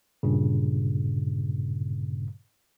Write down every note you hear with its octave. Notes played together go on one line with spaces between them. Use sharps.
G2 A#2 C#3